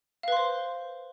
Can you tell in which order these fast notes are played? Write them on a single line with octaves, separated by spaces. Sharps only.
F5 B4 C6 C5